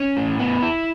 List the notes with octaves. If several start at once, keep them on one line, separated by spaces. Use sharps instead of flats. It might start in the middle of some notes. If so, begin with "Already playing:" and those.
Already playing: C#4
A2
B3
E4